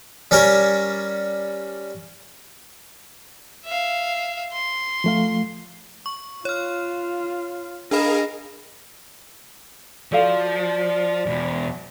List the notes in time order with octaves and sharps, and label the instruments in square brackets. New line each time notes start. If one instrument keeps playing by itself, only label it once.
[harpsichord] G3 C#4 A#4 C#5
[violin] E5 F5
C6
[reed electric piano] F3 A3 F5
[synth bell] C#6
[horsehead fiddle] F4 [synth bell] C#5 F6
[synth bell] D4 B5 [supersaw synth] G#4 A#4 F5 [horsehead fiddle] D#5
[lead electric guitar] F3 [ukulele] F#4 A4 F5 [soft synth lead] D5
[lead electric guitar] E2 B2